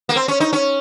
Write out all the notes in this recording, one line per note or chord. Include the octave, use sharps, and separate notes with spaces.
A#3
C4
C#4
D#4
C#4